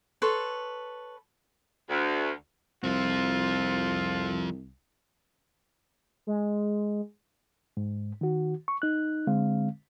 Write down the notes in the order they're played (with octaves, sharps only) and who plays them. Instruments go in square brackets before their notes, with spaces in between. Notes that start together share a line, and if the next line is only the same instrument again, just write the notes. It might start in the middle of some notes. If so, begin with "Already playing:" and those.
[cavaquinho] A4 B4 C#5 C6
[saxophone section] D2
[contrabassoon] C2 [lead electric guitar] F3 C4 [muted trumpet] F4
[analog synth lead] G#3
[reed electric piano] G#2
D#3 F#4
C#6
D#4 F#6
D3 G#3 C4 F5